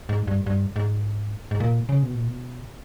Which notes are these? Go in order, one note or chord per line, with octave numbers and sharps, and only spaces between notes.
G#2
G2
G2
G#2
G#2
A#2
C#3
B2
A#2
B2